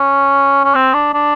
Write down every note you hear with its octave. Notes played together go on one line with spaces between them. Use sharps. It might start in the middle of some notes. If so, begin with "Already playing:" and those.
Already playing: C#4
C#4
C4
D4
D4